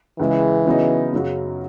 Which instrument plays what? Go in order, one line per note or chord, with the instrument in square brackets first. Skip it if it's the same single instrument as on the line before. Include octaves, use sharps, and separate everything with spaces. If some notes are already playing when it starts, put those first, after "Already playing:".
[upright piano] C#2 C#3 G#3 [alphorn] E3
[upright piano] C#3 F#3 B3 D#4
F#2 C#3 F#3